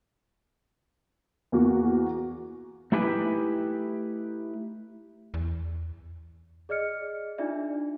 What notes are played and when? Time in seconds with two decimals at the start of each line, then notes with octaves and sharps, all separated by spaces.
1.52 E2 A#3 F#4
2.92 A3 D#4 E4 G4 B4 G#5
5.34 E2
6.69 G#4 D5 D#5 F6 C#7
7.38 D4 D#4 F4 D5 E5